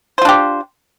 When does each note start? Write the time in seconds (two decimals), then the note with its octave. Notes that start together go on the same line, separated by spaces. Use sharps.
0.18 C5
0.22 F4
0.25 D4
0.29 G4